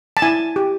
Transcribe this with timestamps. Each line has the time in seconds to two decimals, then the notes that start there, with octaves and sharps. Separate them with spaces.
0.17 A5
0.22 E4 G#5
0.56 G4